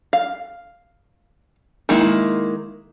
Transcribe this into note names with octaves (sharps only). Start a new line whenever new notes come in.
F5
D#3 G#3 A#3 E4